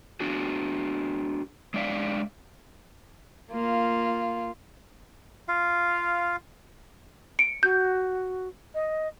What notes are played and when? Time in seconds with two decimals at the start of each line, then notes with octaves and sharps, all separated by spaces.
0.20 D4 F#4 G#4
1.74 G#3 D4 D5 E5 F5
3.52 A#3 F4
5.48 F4 F5
7.39 C#7 D7
7.63 F#4 G6
8.75 D#5